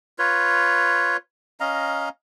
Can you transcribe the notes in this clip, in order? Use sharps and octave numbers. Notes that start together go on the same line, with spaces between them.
F4 B4 C#5
C#4 D#5 F5 A#5